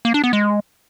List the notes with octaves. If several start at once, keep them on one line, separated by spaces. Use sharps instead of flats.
A#3
D4
B3
G#3